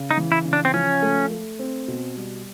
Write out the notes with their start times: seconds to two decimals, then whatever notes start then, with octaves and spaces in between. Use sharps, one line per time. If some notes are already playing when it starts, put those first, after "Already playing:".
Already playing: C#3
0.11 D#4
0.17 E3
0.32 E4
0.45 C#3
0.53 D4
0.65 C4
0.74 F3 C#4
1.02 A3
1.31 A3
1.59 C4
1.88 B2
2.16 G3